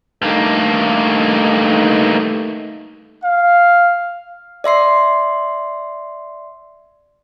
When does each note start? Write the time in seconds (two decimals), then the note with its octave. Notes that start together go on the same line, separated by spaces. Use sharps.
0.22 G2 A3 A#3 D#4
3.23 F5
4.64 D5 E5 C6 C7